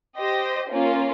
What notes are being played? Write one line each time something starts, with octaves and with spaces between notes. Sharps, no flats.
G4 C5 D#5
A#3 C#4 F4